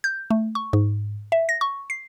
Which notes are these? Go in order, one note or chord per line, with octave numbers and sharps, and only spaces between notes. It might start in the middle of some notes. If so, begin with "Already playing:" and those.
G6
A3
C#6
G#2
E5
A#6
C#6
C7